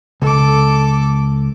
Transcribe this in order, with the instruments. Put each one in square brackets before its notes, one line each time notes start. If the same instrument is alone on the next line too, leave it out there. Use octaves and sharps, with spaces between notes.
[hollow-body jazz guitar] C#2 [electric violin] A4 D6